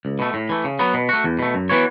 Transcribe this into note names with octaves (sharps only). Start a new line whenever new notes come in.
C#2
B2 A3
A2
E3 A3
C#3
F#3 B3
B2
A3 F#4
E2
B2 A3
F#2
E3 B3 F#4 C#5